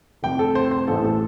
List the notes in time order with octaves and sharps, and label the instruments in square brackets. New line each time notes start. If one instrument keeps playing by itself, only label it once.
[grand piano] F1 F2 C3 G5
A4
C5
C5
A1 A2 A4
A4